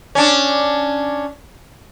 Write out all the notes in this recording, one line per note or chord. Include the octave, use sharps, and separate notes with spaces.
C#4 D4